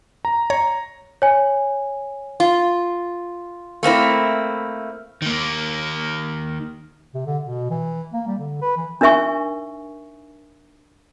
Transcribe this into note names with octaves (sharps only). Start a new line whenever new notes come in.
A#5
C#5 A#5
C#5 G#5
F4
A3 A#3 C4 E4
D#3 A#3
C3
D3
B2
E3
A#3
G3
D3
B4
E3
D4 D#4 A#4 E5 G#5 C#6